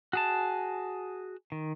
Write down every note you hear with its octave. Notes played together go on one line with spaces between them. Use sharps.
F#4 G#4 A5
D#3